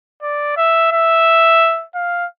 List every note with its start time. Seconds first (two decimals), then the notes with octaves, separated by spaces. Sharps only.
0.22 D5
0.57 E5
0.92 E5
1.95 F5